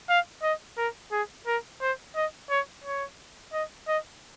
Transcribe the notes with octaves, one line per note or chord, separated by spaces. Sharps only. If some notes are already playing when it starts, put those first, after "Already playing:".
F5
D#5
A#4
G#4
A#4
C5
D#5
C#5
C#5
D#5
D#5